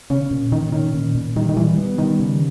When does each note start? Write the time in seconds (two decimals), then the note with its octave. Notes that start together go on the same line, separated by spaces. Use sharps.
0.10 C#3 C#4
0.31 A#2
0.52 A#2 D#3
0.72 D#3 C#4
0.94 A#2
1.15 A#2
1.36 D#3 G3
1.49 D#3
1.57 E3 G3
1.78 B3
1.98 D#3 G3
2.20 C#3